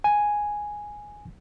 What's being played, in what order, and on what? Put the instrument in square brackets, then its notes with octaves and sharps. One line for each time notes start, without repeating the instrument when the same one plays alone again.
[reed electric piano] G#5